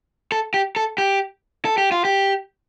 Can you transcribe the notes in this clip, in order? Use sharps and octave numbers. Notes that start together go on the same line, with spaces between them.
A4
G4
A4
G4
A4
G4
F4
G4